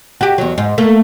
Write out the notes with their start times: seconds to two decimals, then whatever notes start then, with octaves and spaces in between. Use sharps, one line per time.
0.21 F#4 G4
0.38 E2 F#3
0.58 G#2
0.78 A3 A#3